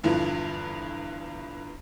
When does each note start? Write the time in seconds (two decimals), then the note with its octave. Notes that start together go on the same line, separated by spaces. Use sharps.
0.03 E2 G2 D3 E3 F3